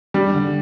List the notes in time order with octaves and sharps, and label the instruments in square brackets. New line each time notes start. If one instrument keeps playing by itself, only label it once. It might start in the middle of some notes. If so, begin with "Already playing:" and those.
[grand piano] G3 [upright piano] D4
[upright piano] D3